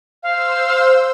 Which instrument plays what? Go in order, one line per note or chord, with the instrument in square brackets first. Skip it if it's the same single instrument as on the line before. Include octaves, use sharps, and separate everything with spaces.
[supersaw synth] C5 E6 [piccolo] F5